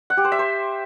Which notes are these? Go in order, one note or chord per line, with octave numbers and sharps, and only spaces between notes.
F#5
G4
C5
E5
C5